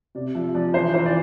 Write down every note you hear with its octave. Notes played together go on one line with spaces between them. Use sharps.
C3 D5
F3 E5
F3 D5
E3 C5
E3 C5
D5